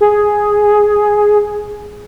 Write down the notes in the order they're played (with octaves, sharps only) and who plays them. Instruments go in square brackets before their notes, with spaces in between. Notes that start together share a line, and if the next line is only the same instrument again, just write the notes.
[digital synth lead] G#4